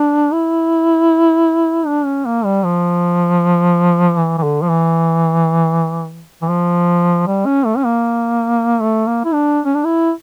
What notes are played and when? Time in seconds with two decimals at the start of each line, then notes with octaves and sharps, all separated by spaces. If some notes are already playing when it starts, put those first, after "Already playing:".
Already playing: D4
0.33 E4
1.86 D4
2.05 C#4
2.26 A#3
2.45 G3
2.64 F3
4.18 E3
4.38 E3
4.43 D3
4.62 F3
4.69 E3
6.42 E3
6.50 F3
7.27 G3
7.46 C#4
7.66 A3
7.77 C#4
7.85 A#3
8.81 A3
9.07 A#3
9.25 E4
9.33 D4
9.65 C#4
9.75 D4
9.85 E4